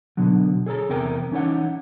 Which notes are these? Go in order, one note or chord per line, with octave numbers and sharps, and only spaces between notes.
B2 D3 F#3
G#4 A4 C#5 A#5
E2 C3 A#4 G5
E3 C#4 D#4 C#5 F#5